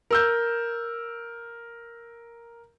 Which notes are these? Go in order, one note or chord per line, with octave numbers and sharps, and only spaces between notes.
A#4 E6 G6